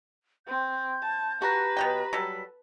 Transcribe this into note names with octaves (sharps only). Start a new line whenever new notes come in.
C4 G6
A5
F#4 G4 B4 A#5 A#6
B2 F#3 G5
F#3 G3 A4 B6